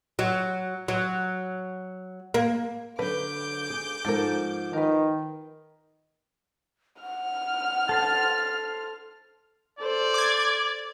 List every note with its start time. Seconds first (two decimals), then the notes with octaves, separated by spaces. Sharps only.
0.19 F#3
0.88 F#3
2.34 A#3
2.99 D3 F#3 B4 D6 G6
3.70 G#4
4.05 G#2 F3 A4 A#4
4.73 D#3 A#4 B4
7.02 F#5 F6
7.89 A4 C5 A5
9.79 A4 C5 D5
10.14 D6 G#6